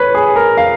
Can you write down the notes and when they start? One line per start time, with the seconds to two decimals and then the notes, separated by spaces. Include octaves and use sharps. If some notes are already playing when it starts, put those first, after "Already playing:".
Already playing: B4 C#5
0.14 G#4
0.36 A#4
0.57 F5